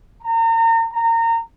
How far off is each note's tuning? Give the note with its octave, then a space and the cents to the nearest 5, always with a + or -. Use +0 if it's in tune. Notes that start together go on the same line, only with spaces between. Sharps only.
A#5 -35
A#5 -25